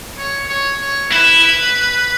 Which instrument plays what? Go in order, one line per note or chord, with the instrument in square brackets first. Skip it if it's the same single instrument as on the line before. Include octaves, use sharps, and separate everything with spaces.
[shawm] C#5
C#5
C#5
[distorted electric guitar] E4 [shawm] B4